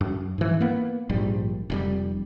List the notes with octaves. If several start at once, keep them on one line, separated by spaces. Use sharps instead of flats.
F#2
G#2 E3
A#3 B3
A#1 G#2 G3
F1 A2 G3